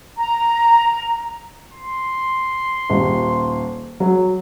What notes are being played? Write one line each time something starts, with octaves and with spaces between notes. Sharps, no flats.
A#5
C6
D#1
F#3